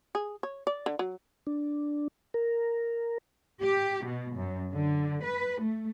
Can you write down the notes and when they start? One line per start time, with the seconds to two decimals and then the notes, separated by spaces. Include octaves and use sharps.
0.15 G#4
0.43 C#5
0.67 D5
0.86 D3
0.99 F#3
1.47 D4
2.34 A#4
3.63 G4
4.06 B2
4.36 F#2
4.73 D3
5.23 B4
5.61 A3